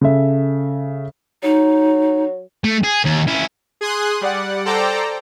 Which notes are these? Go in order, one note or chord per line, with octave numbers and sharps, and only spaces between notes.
C#3 A4 E5
F#3 D#4
A3
G#4
D#2
C#4 E4
G#4 G#5 C6 D#6 F#6
G3 D5 F#5
A4 C5 D5 G5 A#5 D6